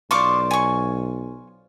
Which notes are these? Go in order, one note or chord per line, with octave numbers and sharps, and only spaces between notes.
B1 F4 C5 D5 C#6 D6
G#5 C#6